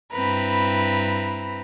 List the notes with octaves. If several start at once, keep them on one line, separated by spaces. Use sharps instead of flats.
G2 C4 E4 B4 A#5 B5